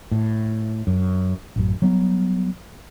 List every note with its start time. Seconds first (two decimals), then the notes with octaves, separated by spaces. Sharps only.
0.12 A2
0.87 F#2
1.56 A1 F#2
1.82 F#3 G3 B3